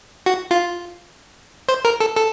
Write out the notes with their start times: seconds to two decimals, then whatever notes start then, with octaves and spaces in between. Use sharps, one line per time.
0.26 F#4
0.51 F4
1.69 C5
1.85 A#4
2.00 A4
2.16 A4